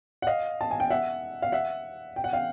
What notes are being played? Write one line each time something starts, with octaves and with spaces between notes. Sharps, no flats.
F#5
D#5 F5
A5
G#5
G5
E5 F#5
F5
E5 F#5
G5
F#5
F5 G5